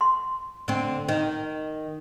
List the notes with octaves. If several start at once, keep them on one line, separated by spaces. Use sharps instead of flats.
C6
D3 C4
D#3